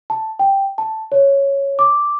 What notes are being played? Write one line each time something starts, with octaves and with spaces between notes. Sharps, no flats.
A5
G5
A5
C#5
D6